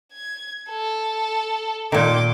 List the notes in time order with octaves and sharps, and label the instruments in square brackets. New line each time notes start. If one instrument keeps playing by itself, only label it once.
[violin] G#6
A4
[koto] A#2 D#3 [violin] C6 D6